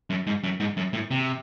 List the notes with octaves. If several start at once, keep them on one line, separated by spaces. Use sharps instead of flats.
F#2
G#2
F#2
G#2
F#2
A2
C3